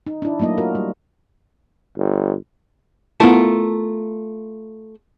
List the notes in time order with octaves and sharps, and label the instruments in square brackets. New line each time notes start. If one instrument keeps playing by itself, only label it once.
[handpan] D#4
D4 E4
F#3 A3 A#3 E4 D#5
F4 F#4 A#4
G3
[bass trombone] G1
[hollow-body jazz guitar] A3 F4 A#4 [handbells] B3 E4 A5